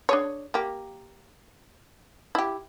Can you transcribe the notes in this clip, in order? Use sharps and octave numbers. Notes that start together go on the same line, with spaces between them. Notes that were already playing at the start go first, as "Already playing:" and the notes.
D4 G#4 C#5
A#3 G4
E4 G4